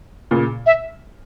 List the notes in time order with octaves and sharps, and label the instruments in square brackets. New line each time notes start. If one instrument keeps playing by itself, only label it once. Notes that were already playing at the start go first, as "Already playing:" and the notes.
[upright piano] A#2 C#3
[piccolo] E5